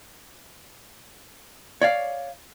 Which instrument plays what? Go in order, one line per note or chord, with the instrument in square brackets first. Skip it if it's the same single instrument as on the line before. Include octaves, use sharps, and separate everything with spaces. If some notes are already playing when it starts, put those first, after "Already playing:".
[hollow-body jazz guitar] C#5 D5 F5